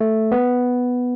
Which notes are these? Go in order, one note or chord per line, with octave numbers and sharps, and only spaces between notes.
A3
B3